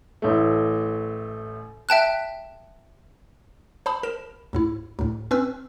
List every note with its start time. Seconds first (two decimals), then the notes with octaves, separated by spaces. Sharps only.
0.22 A1 A3
1.89 E5 G5 A5 F#6
3.86 C5 A5 B5 D#6
4.03 A#4 E7
4.53 D2 G#2 E4
4.99 D2 A2
5.31 C4 C#4 B4 E6 F6